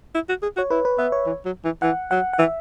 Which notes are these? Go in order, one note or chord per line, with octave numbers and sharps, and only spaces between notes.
E4
F#4
G#4
F#4 C#5
E4 B4
B4
B3 E5
C#5
E3
F#3
E3
E3 F#5
F#3 F#5
F#5
E3 E5